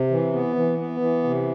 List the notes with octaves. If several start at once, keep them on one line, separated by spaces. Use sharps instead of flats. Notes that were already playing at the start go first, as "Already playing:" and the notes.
Already playing: C3
E3
B3
E3
B3
E3
C3